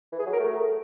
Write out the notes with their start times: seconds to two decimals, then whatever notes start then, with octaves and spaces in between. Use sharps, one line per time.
0.12 E3
0.19 G#4
0.26 F#3
0.33 A#4
0.40 A3